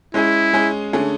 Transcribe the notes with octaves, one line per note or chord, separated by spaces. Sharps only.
G#3 C#4 E4 G#4
G#3 C#4 G#4
D3 A3 C#4 G#4